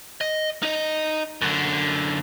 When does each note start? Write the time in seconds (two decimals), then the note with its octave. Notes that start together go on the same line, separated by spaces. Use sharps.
0.21 D#5
0.63 D#4 D#5
1.41 F#2 D3